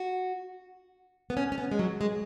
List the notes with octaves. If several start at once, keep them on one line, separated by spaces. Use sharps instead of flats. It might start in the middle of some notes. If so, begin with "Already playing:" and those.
Already playing: F#4
B3
C#4
C#4
B3
G#3
F#3
G#3